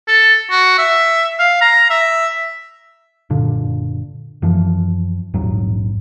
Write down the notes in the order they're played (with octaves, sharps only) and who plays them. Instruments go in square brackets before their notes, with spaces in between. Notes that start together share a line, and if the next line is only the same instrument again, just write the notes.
[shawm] A4
F#4
E5
F5
A#5
E5
[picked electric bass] F#1 A#2 D3
F#2 E3 F3
A#1 E2 G#2 F#3